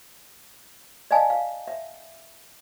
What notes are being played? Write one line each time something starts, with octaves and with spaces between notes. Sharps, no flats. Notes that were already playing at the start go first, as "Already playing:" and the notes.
D5 D#5 F5 G#5 A5
F5
E5